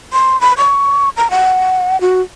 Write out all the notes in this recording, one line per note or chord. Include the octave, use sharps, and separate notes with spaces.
C6
B5
C#6
A#5
F#5
F#4